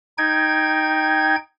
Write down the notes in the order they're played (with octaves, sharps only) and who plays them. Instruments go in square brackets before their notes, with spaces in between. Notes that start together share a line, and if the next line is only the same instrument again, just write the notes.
[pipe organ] D#4 G5 G#6